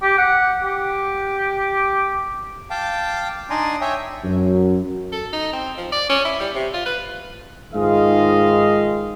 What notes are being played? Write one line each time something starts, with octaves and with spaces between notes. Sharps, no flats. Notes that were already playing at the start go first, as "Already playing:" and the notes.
G4
F#5
G4
F5 G5 A5 D6
D4 D#4 D5 G#5 A#5 C6
C#5 E5 G5 G#5
F#2
A4
D#4
C4
F3
D5
C#4
E4
G3
C3
F4
B4
G#2 D#3 F4 G#4 D#5 F5